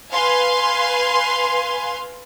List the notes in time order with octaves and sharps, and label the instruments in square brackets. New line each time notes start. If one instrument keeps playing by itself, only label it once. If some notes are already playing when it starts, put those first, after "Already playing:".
[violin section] B4 F5 G#5 C6